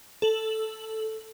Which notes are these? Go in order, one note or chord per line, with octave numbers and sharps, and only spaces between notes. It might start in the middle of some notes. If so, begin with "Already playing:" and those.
A4 F#7